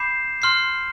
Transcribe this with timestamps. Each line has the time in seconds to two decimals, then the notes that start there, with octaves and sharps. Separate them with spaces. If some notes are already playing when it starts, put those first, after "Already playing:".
Already playing: B5 D6 G6 C7 E7
0.42 C6 F6 C7